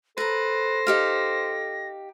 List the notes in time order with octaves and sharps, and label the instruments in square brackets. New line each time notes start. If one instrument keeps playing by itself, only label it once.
[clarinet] A4 [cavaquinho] B4 A#5 [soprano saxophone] C5 [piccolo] A#6
[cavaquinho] D#4 G4 F5